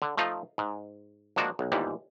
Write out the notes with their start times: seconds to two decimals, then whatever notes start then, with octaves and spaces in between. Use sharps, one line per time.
0.02 D3
0.17 F3 A3 D#4 F4
0.58 G#2
1.36 F3 G#3 A#3 D4 F#4
1.59 B1
1.72 G1 D#2 G#2 E3 G3